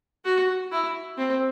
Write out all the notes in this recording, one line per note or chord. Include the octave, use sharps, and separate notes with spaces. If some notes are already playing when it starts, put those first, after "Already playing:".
F#4
E4
C4